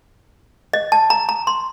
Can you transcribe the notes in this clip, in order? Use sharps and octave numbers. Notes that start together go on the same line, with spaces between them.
D#5
A5
A#5
A#5
C6